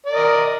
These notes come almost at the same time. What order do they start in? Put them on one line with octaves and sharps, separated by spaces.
D5 A#4 D#5